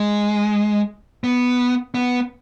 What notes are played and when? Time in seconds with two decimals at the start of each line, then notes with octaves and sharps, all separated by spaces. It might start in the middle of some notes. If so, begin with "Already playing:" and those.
Already playing: G#3
1.24 B3
1.94 B3